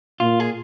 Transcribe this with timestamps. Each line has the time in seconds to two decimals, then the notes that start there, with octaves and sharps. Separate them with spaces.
0.20 A#2 F4
0.40 G#4